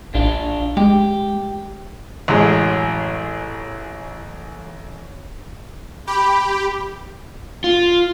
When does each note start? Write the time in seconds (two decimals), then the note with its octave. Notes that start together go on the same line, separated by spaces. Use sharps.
0.14 A#1 D4 F4
0.77 G#3 G4
2.28 A1 F#2 G#3
6.07 G4 B5
7.64 F4